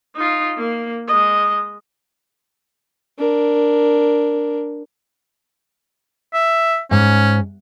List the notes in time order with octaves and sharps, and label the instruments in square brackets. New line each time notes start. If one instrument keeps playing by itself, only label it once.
[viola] D#4 F4
A#3
G#3 D#5
[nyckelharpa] D4 A#4
[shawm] E5
[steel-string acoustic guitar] G#2 [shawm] C#4